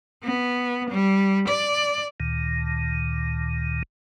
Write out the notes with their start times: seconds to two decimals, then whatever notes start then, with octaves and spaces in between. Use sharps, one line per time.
0.24 B3
0.90 G3
1.48 D5
2.20 D2 A#2 D#3